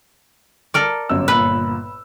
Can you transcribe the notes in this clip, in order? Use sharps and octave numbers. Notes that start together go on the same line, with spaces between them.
A4 A#4 D5
G1 F#2 E6
G1 A#2 B4